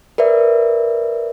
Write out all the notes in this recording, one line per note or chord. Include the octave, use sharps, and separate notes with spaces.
A#4 B4 D5 E5